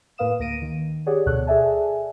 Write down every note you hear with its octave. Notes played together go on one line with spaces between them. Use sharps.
A2 A#3 B4 F5 D#6 E7
D2 A#3 A#6 D7 D#7
D#3
G4 G#4 C#5 D5 F#5
D2 B2 A4 C#5 F#6
G#4 A4 D5 E5 G#5 A5